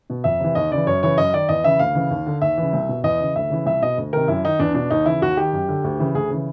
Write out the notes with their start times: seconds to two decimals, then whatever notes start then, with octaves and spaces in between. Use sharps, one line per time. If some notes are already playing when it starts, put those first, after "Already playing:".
0.10 B2
0.24 F2 E5
0.40 C3 E3
0.55 D#2 D#5
0.71 C#3 E3 D5
0.87 F#2 C#5
1.03 C#3 E3 C#5
1.17 F#2 D#5
1.33 D#3 D5
1.49 E2 D#5
1.64 C#3 E3 E5
1.79 D2 F5
1.95 C#3 E3
2.11 D#2
2.26 D3
2.42 D#2 E5
2.57 C#3 E3
2.73 C2
2.89 B2
3.04 E2 D#5
3.20 C#3 E3
3.36 D2 E5
3.50 C#3 E3
3.66 C2 E5
3.82 B2 D#5
3.98 D2
4.13 C3 D#3 A#4
4.28 F#2 E4
4.44 D#3 D#4
4.59 E2 D4
4.75 B2 D4
4.91 D#2 D#4
5.06 C#3 E3 E4
5.21 D#2 F#4
5.37 D#3 G4
5.53 F#2
5.69 D3
5.84 D2
5.99 C#3 E3
6.15 D2 G#4
6.30 C#3 E3